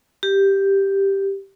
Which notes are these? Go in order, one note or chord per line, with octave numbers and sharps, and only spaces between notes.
G4